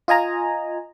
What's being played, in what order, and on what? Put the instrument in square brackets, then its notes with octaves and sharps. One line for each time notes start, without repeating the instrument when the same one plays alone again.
[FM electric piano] F4 D#5 G#5 A#5